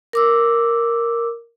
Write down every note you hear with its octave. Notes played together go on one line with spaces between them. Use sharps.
A#4 D6 E6